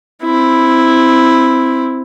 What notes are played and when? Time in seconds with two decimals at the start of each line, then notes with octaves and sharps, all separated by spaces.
0.23 C4 E4